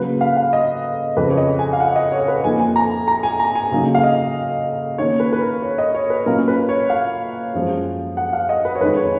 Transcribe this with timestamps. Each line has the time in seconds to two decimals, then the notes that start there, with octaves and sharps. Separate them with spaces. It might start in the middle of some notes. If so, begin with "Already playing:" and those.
Already playing: C#3 F#3 A#3 B4
0.21 F5
0.37 F5
0.53 D#5
1.17 F2 C#3 F3 B4
1.31 C#5
1.37 D#5
1.59 G#5
1.73 F5
1.80 F#5
1.96 D#5
2.12 C#5
2.28 B4
2.44 F2 F3 A#3 D#4 G#5
2.60 G#5
2.76 A#5
3.08 A#5
3.23 G#5
3.40 A#5
3.55 G#5
3.71 C#3 F#3 A#3 D#4
3.95 F5
4.03 D#5
4.98 D#3 A#3 C#4 C#5
5.20 B4
5.33 B4
5.41 A#4
5.62 C#5
5.78 D#5
5.95 C#5
6.10 B4
6.26 A#2 F#3 C#4 F4 A#4
6.48 B4
6.69 C#5
6.90 F5
7.54 F#2 F3 G#3
8.17 F#5
8.33 F5
8.49 D#5
8.65 B4
8.75 C#5
8.81 F2 D#3 G#3 D#4 B4
8.96 C#5